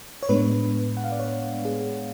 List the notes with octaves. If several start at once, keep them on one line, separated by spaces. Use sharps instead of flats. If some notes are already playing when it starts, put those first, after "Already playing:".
C#5
A2 G#3 B3 D4 B4
F#5
F5
D5
C#5
G#4